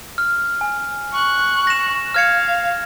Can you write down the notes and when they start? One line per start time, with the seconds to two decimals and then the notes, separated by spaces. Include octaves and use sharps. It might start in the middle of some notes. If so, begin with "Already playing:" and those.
0.18 F6
0.61 G#5
1.12 C#6 F#6
1.67 A#6 E7
2.14 F5 F6 G#6 C#7